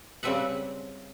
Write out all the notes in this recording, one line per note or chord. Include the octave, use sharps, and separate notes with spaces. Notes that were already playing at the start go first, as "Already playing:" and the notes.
C#3 G3 C4 B4 E5 F#5